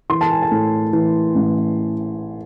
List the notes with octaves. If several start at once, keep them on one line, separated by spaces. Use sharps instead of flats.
E3 C6
A5
G#5
A5
A2
E3
A1